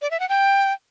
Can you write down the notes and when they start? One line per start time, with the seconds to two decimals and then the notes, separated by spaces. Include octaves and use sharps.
0.02 D5
0.11 E5
0.20 F#5
0.29 G5